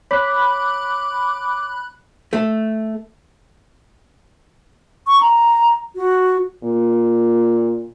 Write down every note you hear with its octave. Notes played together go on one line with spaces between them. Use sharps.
C#5 B5 D6 F#6
A3
C#6
A#5
F#4
A#2